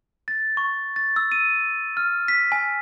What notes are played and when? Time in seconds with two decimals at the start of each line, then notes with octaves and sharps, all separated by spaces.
0.28 A6
0.57 C#6
0.96 A6
1.16 E6
1.32 D#7
1.97 F6
2.28 B6
2.52 G#5